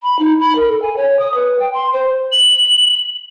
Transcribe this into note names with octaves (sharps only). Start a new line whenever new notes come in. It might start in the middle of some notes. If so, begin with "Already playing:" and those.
B5
D#4
B5
A#4
A4
G#5
C#5
D#6
B4
G5
C6
C5
F#7